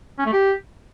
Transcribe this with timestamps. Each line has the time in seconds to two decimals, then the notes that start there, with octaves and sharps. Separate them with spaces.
0.19 C#4
0.26 A3
0.33 G4